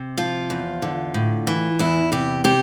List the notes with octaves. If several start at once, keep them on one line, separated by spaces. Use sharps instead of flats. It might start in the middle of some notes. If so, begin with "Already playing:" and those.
Already playing: C3
F3 F4
E2
D3
A2
E3
E2 E4
C3 G4
C3 G4